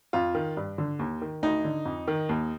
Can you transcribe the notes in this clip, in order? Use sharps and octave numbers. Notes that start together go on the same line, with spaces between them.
F2 F4
D#3
G2
D3
D#2
D#3
D2 D#4
D3
F2
D#3
D#2